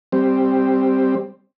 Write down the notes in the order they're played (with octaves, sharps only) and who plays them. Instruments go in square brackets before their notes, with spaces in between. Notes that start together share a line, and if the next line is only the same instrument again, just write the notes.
[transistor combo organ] G3 C4